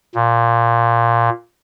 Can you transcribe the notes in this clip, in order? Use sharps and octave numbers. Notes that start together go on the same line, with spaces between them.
A#2